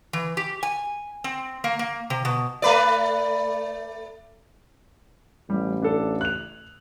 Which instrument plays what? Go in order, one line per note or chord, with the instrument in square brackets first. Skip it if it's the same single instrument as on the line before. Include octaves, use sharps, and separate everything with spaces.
[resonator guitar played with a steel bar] E3
G4
G#5
C4
A#3
A#3
C3
B2
[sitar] A3 B4 D5
[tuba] A1 [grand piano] G3
[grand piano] D4 A4
F#6 F7